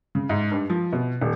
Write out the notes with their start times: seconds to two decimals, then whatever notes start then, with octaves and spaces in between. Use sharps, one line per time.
0.15 C#3
0.29 G#2
0.52 G2
0.70 F3
0.93 B2
1.21 D#1